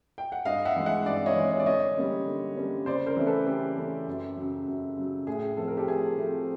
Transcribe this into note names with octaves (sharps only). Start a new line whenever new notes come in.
G5
F#5
G2 D#5 F5
E5 F#5
E3 G#3
E5 F#5
G2 D5 E5
C#5 D#5
E3 G#3
C#5
D5
D3 C#5 D#5
G3 A#3 C#4
D3
G3 A#3 C#4
C#3 C5 D5
A#4 C5
E3 A3 C#4
A4 B4
C#3 G4 A4
E3 A3 C#4
F#2
C#3 F#3
F#2
C#3 F#3
A2 G#4
F3 A3 C4 A4
A#4
G4 A4
A2 G#4
F3 A3 C4